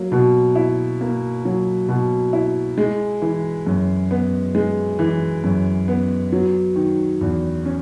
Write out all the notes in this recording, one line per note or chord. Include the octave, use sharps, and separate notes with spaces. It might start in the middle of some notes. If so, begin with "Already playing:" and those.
Already playing: F#3 A#3
B2
E4
A#3
F#3
B2
E4
G#3
E3
F#2
B3
G#3
E3
F#2
B3
F#3
D#3
E2
C#4